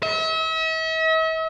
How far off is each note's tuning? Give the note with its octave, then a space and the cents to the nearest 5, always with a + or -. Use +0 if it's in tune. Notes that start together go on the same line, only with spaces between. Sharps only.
E5 -45